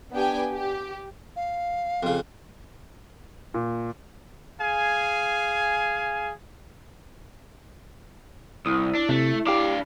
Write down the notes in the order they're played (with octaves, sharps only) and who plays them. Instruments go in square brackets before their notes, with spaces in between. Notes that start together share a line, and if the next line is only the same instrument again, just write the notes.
[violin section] B3 D4 G4 G5 G#5
G4
[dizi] F5
[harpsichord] F2 C#3
[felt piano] A#2
[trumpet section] G#4 F5 G#5
[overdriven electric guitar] C2 [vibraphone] E4 [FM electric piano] D#6
[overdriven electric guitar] D4
[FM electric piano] C3 [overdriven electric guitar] A3
[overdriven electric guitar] D4 F5 [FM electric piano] G4 D6